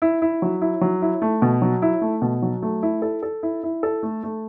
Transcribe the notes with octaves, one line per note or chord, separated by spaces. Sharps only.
E4
E4
F#3
E4
F#3
E4
A3
B2
F#3
E4
A3
B2
F#3
A3
E4
A4
A4
E4
E4
A4
A3
A3